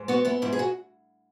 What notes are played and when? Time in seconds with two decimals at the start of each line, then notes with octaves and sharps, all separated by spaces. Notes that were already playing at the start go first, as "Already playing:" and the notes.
Already playing: G#2
0.08 B3 F#4
0.25 B3 E4
0.42 G#2 E4
0.53 G#4
0.59 F#4